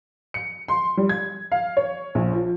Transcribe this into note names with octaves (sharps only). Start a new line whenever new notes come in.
C#7
C6
G3
G#6
F5
C#5
A#1
F3